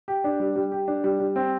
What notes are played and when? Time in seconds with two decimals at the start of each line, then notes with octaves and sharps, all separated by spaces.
0.08 G4
0.24 D4
0.40 G3
0.56 G3
0.72 G4
0.88 D4
1.04 G3
1.20 G3
1.36 C4